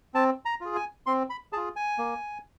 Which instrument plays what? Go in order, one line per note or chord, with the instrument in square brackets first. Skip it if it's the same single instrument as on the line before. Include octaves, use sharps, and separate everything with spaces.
[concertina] C4 A5
A#5
F4 G#4
G#5
C4 C6
B5
F4 G#4 A5
G#5
A#3